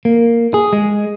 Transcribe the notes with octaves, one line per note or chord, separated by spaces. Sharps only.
A#3
G#4
G#3